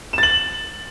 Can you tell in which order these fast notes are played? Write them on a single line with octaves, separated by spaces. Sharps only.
E7 A6 F#7